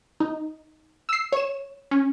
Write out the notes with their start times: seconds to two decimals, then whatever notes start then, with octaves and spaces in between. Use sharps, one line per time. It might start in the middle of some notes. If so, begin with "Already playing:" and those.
0.20 D#4
1.09 E6 C7
1.32 C#5 E7
1.91 C#4